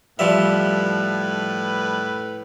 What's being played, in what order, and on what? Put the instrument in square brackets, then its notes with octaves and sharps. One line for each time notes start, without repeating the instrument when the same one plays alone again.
[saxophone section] A2 B4 [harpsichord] F3 G3 E5